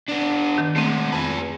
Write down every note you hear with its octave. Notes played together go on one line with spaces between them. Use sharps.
B3 D4
D#3
G#3 A3 B3 C4
F2 G#4 B4